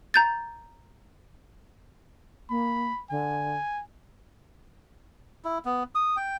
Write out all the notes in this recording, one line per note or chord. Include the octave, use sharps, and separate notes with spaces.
A#5 G6 A6
A#3 B5
D3 G#5
E4
B3
D#6
G5